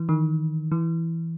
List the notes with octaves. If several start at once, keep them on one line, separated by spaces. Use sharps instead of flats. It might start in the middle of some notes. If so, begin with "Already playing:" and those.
Already playing: E3
D#3
E3